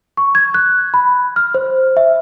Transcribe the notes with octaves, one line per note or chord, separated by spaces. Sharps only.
C#6
G#6
F#6
B5
F6
C5
E5